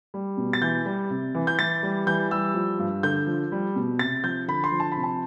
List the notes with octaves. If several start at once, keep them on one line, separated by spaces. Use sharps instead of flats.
G3
B2
A6
E3 G6
G3
C3
E3
G6
E3 A6
G3
E3 G6
G3 E6
F3
G2
D3 G6
F3
G3
B2
C3 A6
F3 G6
D3 B5
C6
F3
A5
C3 B5
A5